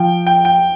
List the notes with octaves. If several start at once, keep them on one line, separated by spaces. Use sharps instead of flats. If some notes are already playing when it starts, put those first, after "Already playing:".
Already playing: F3 G5
G5
G5